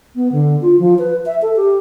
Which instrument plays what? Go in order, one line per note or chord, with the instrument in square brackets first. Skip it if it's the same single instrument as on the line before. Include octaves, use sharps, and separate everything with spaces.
[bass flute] B3
D3
F4
F3
B4
E5
A4
G4